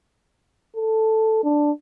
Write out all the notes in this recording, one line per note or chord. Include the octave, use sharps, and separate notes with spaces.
A4
D4